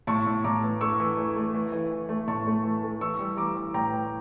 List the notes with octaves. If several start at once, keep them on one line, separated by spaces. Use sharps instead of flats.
A2 A5 C#6
A2
A2 A#5 D6
E3
A3 C#6 E6
E3
A3
A3
E3
E3
E3
A3
A2 A5 C#6
A3
E3
A3
E3 C#6 E6
G3
E3 A#5 D6
E3
A2 G5 A#5
E3